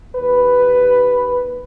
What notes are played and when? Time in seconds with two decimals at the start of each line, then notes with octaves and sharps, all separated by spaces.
0.16 D#2 B4